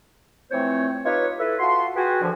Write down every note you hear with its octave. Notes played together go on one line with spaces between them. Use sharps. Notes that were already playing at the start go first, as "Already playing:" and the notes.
E3 F3 A3 C4 C5 C#5
D#4 F4 G4 B4 C#5
E4 A4 B4
F4 F#4 A5 C6
F#4 G#4 B4 G5 G#5
D3 E3 F3